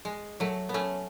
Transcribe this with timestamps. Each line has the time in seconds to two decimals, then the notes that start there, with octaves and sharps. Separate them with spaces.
0.05 G#3
0.40 F#3 A3
0.69 B3
0.74 A3 C#4